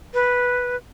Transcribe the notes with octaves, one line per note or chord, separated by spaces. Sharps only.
B4